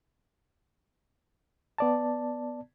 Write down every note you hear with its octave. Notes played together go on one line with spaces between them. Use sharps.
B3 D5 A5